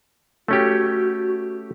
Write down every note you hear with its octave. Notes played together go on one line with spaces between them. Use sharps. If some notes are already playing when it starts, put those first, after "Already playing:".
A3 C#4 F#4 G4